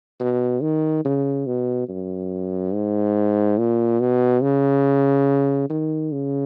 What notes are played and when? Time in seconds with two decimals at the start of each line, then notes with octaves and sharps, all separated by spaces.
0.20 B2
0.62 D#3
1.05 C#3
1.47 B2
1.89 F#2
2.74 G#2
3.58 A#2
4.00 B2
4.42 C#3
5.70 D#3
6.12 C#3